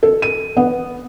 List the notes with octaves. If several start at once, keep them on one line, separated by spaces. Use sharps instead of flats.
A4
D#7
B3